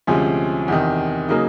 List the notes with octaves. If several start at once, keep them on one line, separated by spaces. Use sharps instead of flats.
D2 C3 F3 G#3 C#4
E2 C3 D#3
C#3 F#3 A#3 D#4